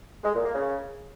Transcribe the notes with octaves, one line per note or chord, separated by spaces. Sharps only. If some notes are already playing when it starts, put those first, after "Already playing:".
G#3
A#2
A#3
C#3